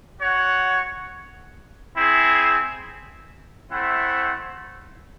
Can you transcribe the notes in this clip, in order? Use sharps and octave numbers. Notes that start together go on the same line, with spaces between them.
F#4 C#5 F#5
C4 E4 G#4
A3 C4 E4 C5 F#5